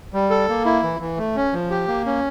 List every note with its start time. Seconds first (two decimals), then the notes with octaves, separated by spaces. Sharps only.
0.14 G3
0.30 A4
0.49 A#3
0.65 E4
0.83 E3
1.00 E3
1.18 A3
1.36 C#4
1.53 F3
1.70 G4
1.88 A#3
2.06 C#4